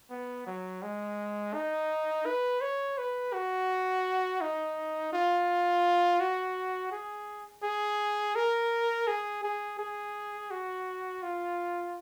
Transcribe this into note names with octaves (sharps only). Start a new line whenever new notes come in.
B3
F#3
G#3
D#4
B4
C#5
B4
F#4
D#4
F4
F#4
G#4
G#4
A#4
G#4
G#4
G#4
F#4
F4